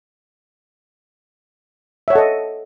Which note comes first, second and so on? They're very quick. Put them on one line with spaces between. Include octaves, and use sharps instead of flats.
E5 C#5 F#5 A4 D#5